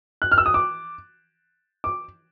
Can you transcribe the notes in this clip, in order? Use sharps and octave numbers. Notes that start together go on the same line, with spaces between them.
F#6
F6
E6
D#6
D6
D6